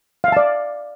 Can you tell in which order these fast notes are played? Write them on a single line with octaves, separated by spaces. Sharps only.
F5 E5 A5 D5